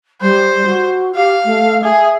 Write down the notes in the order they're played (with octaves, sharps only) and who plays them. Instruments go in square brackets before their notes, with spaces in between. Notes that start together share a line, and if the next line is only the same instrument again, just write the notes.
[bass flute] G3 [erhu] C5
[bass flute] F#4
[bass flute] G4 [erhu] F5
[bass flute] A3
[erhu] G#4 [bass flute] E5